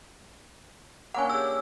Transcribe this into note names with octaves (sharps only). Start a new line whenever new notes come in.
A#3 C#4 D4 F#5 G#5
G4 G#4 E6